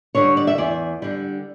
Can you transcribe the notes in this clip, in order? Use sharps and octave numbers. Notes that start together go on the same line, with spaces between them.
D3 G3 C#5
D5
E5
E2 D5
D3 G3